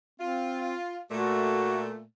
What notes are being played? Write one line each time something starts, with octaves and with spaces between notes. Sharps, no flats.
C4 F4
A#2 A3 F#4